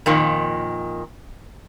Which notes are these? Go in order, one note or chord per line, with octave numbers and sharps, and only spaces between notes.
F2 A#2 D#3